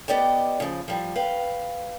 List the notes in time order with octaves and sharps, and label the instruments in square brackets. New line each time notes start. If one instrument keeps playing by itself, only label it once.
[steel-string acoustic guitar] B3 G4 D5 D#5 G5
C#3 F3
F3 G3
B4 F5 G5